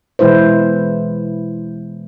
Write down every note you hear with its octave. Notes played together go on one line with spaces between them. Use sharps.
B2 E3 G#3 E4 B4 C5